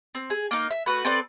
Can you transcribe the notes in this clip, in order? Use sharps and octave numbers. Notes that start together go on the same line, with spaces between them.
C4
G#4
A#3 D#4
E5
A3 F#4 B4
C4 A4 B4 D5